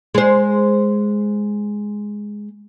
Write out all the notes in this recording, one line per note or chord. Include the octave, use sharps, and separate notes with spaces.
G#3 C5